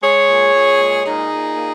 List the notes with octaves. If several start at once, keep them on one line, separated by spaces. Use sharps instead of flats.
G#3 G#4 C#5
A#2
A#2
G#3
A#2 D#4 G#4
A#2
A#3